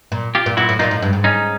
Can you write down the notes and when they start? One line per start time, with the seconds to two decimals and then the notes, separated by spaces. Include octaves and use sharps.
0.12 A#2
0.35 F4 G4
0.46 A#2
0.57 A#2 E4 F#4
0.69 A2
0.79 A#2 D#4 F4
0.91 A2
1.02 G2
1.13 G#2
1.24 C#4 D#4